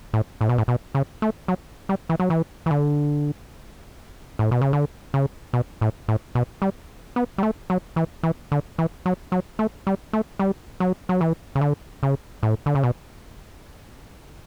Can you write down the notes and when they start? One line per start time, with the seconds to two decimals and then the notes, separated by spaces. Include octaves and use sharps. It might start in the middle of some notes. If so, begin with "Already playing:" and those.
0.14 A2
0.41 A2
0.49 B2
0.58 A2
0.68 B2
0.95 C#3
1.22 A3
1.48 F#3
1.89 G3
2.09 E3
2.20 F#3
2.30 E3
2.66 E3
2.71 D3
4.39 A2
4.51 B2
4.62 C#3
4.73 D3
5.14 C#3
5.53 B2
5.81 A2
6.08 A2
6.35 B2
6.62 G3
7.16 B3
7.38 G3
7.43 A3
7.70 F#3
7.96 E3
8.23 E3
8.52 D3
8.78 E3
9.06 F#3
9.32 F#3
9.59 A3
9.87 G3
10.13 A3
10.39 G3
10.80 F#3
11.09 F#3
11.21 E3
11.55 C#3
11.61 D3
12.03 C#3
12.43 A2
12.66 D3
12.75 C#3
12.83 B2